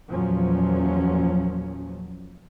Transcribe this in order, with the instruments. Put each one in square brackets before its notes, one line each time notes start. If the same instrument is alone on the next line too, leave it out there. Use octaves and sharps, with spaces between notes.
[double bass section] E2 A#2 F3 F#3 C#4